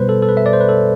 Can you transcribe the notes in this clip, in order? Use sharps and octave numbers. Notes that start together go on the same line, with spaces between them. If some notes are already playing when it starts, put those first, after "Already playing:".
Already playing: B2 G3 B3 B4 C5
A4
A4
B4
E5
D5
C5
B4
A4